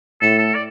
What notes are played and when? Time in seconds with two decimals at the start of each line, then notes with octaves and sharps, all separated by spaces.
0.21 A2 A4
0.38 A4
0.55 D5